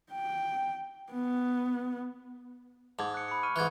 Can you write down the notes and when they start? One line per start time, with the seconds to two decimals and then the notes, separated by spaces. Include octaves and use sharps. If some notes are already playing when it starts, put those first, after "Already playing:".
0.12 G5
1.12 B3
2.99 G#2 A5 D6 G#6
3.14 F#6 C#7
3.28 B5 C#7
3.43 C#6 F6 D#7
3.56 G#2 E3 F#6 G#6